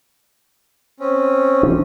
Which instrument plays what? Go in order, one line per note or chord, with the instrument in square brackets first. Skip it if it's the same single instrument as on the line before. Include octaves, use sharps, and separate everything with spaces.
[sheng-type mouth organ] C4 C#4
[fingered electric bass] E3 C#4 D4